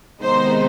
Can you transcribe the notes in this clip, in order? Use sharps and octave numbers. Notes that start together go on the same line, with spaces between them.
C3 D#3 G#3 B3 D#4 C5